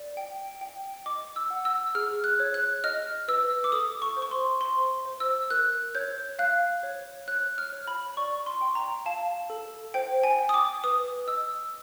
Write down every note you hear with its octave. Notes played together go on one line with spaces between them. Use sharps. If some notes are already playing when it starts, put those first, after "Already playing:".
Already playing: D5
G5
G5
D#5 D6
E6
F#5
E6
G#4 F6
F#6
C#5
F#6
D#5 F6
B4 E6
D6
A4 D#6
C#6
C5
C#6
C6
C5 C6
C5
E6
A#4 F#6
C#5 G6
F5 F#6
C#5
C#5 F#6
F6
C#5
B5
D5 C#6
C6
G5
A#5
F5 A5
A4
C5 G5
G#5
G5
D#6
D6
B4 D#6
D#5 E6